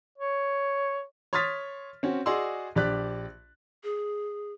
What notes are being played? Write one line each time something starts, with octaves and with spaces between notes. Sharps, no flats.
C#5
C#5 C6 D#6 F6 A6 B6
C4 C#4 F#4
F#4 G#4 D5 D#5 C6 E6
A#1 G4 D5 F#6 B6
G#4